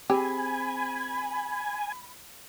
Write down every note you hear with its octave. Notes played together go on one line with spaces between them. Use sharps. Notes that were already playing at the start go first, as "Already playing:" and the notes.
C4 G4 G#4 G#5 B5